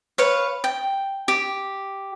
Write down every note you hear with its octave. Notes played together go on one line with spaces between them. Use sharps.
B4 C#5 F5
G5
G4